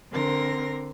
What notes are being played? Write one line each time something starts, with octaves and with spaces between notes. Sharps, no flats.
D3 C4 A#4 C6 A#6